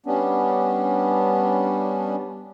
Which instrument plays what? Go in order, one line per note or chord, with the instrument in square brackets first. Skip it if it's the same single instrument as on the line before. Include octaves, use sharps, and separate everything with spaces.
[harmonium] G3 B3 C#4 D4